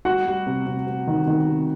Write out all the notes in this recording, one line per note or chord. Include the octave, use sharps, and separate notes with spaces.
G3 F#4 F#5
G3
C3
C3
C3
D#3
D#3
C3